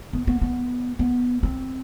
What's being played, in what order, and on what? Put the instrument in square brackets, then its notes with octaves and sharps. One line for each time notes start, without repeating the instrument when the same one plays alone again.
[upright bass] B3
B3
B3
B3
C4